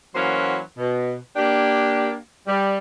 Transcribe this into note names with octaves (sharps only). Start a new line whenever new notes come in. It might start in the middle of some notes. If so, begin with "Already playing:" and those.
E3 F#3 A#3 C#4 F#4 C5
B2
A#3 D4 G4
G3